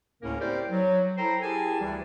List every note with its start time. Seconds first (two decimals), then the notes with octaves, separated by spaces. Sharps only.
0.22 D2 A2 C#3 A#3 C#4 A#4
0.39 C4 E4 G4 A#4 C5 D5
0.70 F#3
1.18 E4 A4 C5 G5 A#5
1.42 E4 G4 G#4 A#4 G#5 A5
1.80 D2 E3 G3